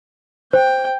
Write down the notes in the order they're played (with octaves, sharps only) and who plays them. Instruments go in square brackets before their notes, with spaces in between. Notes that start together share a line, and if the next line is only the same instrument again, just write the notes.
[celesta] C5 [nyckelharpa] G5